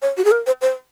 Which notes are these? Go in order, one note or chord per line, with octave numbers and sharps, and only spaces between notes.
C#5
F#4
G#4
A#4
C5
C5